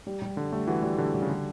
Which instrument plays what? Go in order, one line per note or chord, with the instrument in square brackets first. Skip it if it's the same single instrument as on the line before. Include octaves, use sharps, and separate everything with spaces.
[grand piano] G3
G3
[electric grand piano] D3 [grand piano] G3
[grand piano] G3 [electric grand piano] A3
[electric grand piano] E3 [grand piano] F#4
[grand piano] G3
[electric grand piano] D3 [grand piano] G3
[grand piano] G3
[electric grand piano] C#3
[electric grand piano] D3 [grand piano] G3